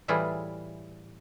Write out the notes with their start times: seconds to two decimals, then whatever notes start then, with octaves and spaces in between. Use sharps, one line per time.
0.08 A2 E3 G3 E4 F4 G#4